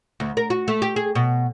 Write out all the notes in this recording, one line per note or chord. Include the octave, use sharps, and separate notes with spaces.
D2
A#4
F#4
A3
G4
G#4
B2